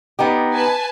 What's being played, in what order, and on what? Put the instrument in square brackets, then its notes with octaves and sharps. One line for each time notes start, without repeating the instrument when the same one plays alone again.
[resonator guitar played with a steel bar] B3 D#4 G4
[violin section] B4 G#5 A5